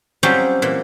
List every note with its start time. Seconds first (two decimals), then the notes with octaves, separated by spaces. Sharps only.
0.23 F#3 G3 C4 C#4 F4 G4
0.62 A#2 E3